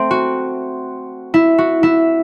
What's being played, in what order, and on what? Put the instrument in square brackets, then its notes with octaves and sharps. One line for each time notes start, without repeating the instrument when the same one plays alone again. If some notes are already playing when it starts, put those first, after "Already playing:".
Already playing: [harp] A3 C4
F#4
E4
F#4
E4